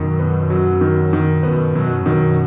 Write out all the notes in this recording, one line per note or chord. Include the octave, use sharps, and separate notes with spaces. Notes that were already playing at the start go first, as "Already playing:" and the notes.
Already playing: F#2 B2 D#3
B3
F#3
D#3
D#3
F#2 B2 B3
F#2 B2 F#3
F#2 B2 D#3